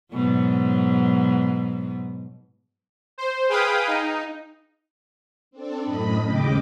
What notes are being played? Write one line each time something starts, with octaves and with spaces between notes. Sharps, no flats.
G#2 B2 F#3
C5
G#4 B4 F5 G5 D#6
D#4
C4 D4 A4
F#2 A2 D#5 B5
D#2 G#2 C#3 D#5 G5 D6